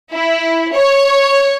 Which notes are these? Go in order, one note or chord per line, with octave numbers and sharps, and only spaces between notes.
E4
C#5